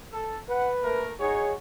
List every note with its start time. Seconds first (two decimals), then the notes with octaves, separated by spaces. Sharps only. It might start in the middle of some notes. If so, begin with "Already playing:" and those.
0.12 A4
0.49 B4 F#5
0.82 A3 A#3 A#4
1.20 D#4 F#4 G#4 C#5